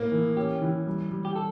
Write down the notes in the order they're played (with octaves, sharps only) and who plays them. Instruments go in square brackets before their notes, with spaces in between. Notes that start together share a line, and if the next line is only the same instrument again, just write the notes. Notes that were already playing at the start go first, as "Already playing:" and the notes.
Already playing: [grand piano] A2 A#3
E3
[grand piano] C#4 [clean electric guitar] G4
[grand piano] E3
G3
G3
[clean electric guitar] G4
A4